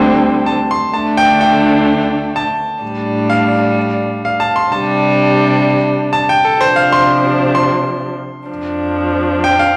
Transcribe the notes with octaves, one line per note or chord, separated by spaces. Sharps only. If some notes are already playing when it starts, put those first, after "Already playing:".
Already playing: D2 D3 G3 C4 G5
A5
C6
D2 D3 A3 D4 A5
G5
G5
A5
A2 G3 D4
F5
F5
A5
C6
C3 G3 D4 A5
A5
G5
A4
C3 F3 D4 C5
F5
C6
C6
F2 F3 D4
G5
F5